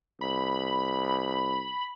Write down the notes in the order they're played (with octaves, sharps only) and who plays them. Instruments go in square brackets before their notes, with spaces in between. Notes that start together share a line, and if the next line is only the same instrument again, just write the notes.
[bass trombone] C2 [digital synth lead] B5